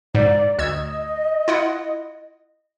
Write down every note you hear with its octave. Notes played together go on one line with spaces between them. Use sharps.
G#2 D5
D2 D#5 E6 G#6
E4 F4 F#5